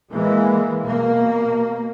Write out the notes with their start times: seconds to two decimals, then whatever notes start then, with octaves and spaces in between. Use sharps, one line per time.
0.10 E3 G#3 A#3
0.83 B2 A#3